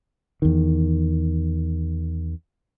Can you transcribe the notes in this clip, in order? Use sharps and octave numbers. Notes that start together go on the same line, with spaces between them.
E2 D#3